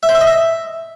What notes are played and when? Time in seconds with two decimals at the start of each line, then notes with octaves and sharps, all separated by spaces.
0.03 E5
0.09 C5
0.15 E5
0.21 D#5
0.27 E5